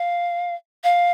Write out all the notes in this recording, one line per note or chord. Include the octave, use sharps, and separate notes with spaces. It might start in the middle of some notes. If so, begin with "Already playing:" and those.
Already playing: F5
F5